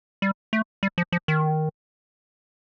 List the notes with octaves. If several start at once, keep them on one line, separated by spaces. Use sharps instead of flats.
G3
A3
G3
F3
F3
D#3